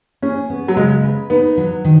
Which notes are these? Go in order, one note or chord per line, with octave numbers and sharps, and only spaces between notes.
C#4 G#4
B3
F#3
C#3 G#3
B4
B3 D#4
F#3
D#3